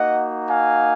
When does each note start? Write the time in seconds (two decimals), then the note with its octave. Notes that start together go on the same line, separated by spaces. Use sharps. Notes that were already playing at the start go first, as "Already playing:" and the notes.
Already playing: A#3 D#4 F#4 D#5 F#5
0.49 F5 G#5